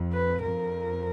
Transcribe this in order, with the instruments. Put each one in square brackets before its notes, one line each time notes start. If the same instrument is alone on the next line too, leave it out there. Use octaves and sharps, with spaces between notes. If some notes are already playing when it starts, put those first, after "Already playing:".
Already playing: [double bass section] F2
[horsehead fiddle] B4
[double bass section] F2 [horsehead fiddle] A#4